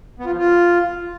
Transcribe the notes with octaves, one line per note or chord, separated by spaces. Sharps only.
B3
F4
F3
F4